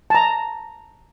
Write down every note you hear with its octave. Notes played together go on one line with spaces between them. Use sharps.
A5 A#5